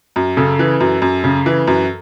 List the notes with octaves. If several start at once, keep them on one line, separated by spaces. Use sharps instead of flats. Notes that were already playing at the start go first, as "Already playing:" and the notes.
F#2
C#3 A4
E3
F#2
F#2
C#3
E3
F#2